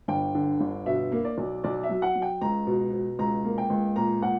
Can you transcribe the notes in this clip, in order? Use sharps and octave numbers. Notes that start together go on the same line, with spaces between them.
G1 G5
D3
G1
B2 E5
A#3
D5
B1
B1 D5
E5
F#3
F#5
F#3
G5
C#2 A#5
B2
B2
C#2 A#5
A#3
G5
C#2
A#2 A#5
A#2 F#5